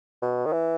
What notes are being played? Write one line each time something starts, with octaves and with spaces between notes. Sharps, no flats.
B2
D#3
E3